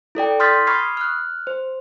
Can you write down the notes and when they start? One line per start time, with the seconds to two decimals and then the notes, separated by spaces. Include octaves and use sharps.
0.15 E4 A4 D5 G5
0.40 C6 D#6 F6 G6 A6 B6
0.67 B5 C#6 D#6 F6 G#6 C7
0.97 F6 F#6
1.47 C5